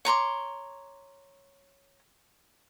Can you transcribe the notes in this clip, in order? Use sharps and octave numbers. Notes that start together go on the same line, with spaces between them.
C#5 A#5 C6 D6